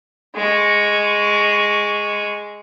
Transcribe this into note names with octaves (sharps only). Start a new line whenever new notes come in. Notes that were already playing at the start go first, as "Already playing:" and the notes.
G#3 C#6